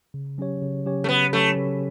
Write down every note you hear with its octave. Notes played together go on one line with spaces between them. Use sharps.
C#3
F#3 C#4 G4 C#5
C#3
F#3 C#4 G4 C#5
A3
C#3 B3
F#3 A3 C#4 G4 C#5
C#3